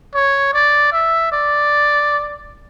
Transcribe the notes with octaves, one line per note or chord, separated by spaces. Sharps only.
C#5
D5
E5
D5